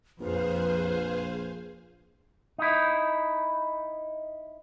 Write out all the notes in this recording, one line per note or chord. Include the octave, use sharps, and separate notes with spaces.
A#1 F2 G#4 B4 C5 F5
D#4 E4